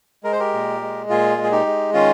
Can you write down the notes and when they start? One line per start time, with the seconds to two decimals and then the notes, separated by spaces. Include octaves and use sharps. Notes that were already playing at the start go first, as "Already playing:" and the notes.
0.24 G#3 A#4
0.32 C5
0.40 G4 A#4
0.53 A#2
0.81 G#3
1.09 A#2 F4 G#4
1.37 G#3
1.44 G#4
1.52 D#4 G4
1.66 G#3
1.93 D#3 C#4 F4